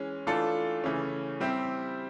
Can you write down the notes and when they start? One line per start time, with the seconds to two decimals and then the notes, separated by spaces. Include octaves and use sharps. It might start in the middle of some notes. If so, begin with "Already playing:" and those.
Already playing: E3 G#3 C#4
0.27 E3 A3 D4 F4 A4
0.84 C#3 E3 A3 C#4
1.40 G3 C4 E4 G4